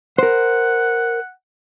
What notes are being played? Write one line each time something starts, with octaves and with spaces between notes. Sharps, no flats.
A#4 C5 F#5